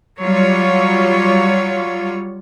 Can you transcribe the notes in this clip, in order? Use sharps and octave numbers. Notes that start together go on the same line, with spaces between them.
F#3 G3 F4 C#5